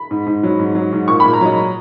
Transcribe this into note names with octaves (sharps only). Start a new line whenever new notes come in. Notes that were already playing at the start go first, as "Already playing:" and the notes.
Already playing: B5
G#2
G#2
F#3
G#2
F#3
G#2
A#2 C#6
B5
A#2
A#5
F#3 D#5